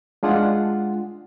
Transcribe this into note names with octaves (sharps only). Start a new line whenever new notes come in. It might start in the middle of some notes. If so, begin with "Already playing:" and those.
G#3 D4 F4 G#4 F#5